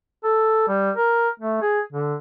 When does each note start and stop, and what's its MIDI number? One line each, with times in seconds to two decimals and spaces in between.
0.24 0.68 69
0.68 0.91 55
0.96 1.29 70
1.40 1.60 57
1.62 1.81 68
1.93 2.15 50